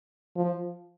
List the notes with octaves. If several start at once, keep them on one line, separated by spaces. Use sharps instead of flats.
F3